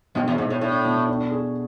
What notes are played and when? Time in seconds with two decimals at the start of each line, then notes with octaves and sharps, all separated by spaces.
0.15 F#2 B2
0.28 E2
0.38 G#2 B2
0.50 A2
0.61 A2 D4
0.86 B2
1.08 D4
1.31 G#4